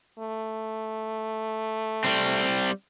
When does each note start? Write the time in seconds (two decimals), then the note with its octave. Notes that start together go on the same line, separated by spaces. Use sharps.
0.19 A3
2.04 G3 C4